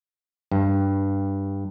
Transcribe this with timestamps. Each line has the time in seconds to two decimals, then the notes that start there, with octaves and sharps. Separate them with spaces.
0.52 G2